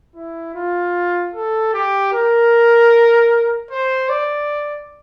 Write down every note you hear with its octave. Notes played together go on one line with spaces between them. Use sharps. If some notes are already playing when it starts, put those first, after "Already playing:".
E4
F4
A4
G4
A#4
C5
D5